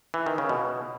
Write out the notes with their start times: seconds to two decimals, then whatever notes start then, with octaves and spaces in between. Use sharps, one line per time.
0.14 E3
0.26 D#3
0.38 C#3
0.49 B2